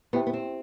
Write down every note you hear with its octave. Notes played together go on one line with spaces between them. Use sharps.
B3 E4 G4 C5 E5 G5
B3
C4